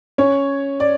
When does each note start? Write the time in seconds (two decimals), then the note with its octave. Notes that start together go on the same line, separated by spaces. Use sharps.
0.18 C#4 C#5
0.80 D5